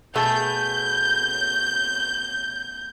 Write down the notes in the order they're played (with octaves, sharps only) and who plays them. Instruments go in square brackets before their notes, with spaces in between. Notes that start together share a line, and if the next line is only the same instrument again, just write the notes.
[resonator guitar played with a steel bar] B2 A3 G#4 [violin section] G6